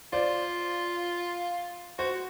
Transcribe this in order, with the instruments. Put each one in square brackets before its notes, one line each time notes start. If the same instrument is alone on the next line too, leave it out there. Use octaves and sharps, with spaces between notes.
[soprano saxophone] F4 [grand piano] C5 D5
[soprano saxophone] F#4 [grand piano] C5